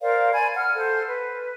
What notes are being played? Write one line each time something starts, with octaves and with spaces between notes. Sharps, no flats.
A#4 C5 D5 F5
D5 G#5 B5 G#6
F#5 F6
A4 C5
B4